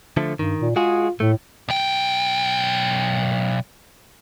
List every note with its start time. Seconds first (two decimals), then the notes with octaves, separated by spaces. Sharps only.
0.17 D3 F3 A3
0.39 G2 D#3
0.61 A#2
0.76 G#3 F4 F#4 G#4
1.20 A2 A3
1.69 B1 G5